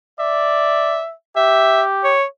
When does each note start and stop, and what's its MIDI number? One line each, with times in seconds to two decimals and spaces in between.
0.19 1.03 74
0.19 1.12 76
1.36 2.16 67
1.36 1.82 76
2.04 2.25 73